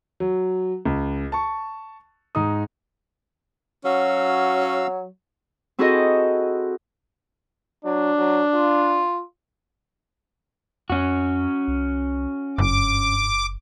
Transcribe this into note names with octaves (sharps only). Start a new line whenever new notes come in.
F#3
C#2
A5 C#6
G#2 D#4 D#6
F#3 C#4 F#4 F5 E6
C4 E4 F#4 G#4 A4 D#5
F#3 D4
F#3
F4
F2 C#4 F#4
C2
F#1 G2 D6